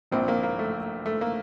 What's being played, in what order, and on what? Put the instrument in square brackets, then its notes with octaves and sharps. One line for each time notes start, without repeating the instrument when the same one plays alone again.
[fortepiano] A#1 A#2 F3 C4
A#3
A#3
A3
A3
A#3